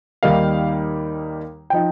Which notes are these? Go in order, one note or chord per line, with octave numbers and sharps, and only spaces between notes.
D#2 D#3 G3 A#3 D#4 F5
F3 D#4 G5